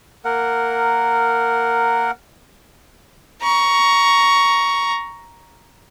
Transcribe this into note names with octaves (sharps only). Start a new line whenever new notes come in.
A#3 A#4 F#5
A#5 C#6